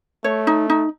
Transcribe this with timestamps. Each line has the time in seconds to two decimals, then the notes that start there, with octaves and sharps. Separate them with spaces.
0.24 A3 C#5
0.47 D#4
0.70 D#4